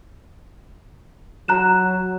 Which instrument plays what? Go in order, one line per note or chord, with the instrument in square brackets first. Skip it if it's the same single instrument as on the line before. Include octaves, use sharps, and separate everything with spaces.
[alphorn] F#3 [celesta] A#5 F#6 E7